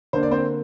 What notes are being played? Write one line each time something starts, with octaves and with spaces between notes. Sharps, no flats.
D3 A#3 D4 C5
D5
C4 C5